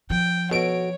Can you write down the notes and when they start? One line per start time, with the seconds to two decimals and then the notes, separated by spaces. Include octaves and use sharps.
0.10 F3 G5
0.51 B2 F#4 A4 C#5 D7